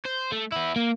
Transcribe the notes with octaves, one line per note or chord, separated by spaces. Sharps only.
C5
A3
B3 E4
A#3